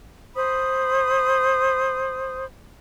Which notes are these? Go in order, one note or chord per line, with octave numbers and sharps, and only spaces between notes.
C5 B5 D#6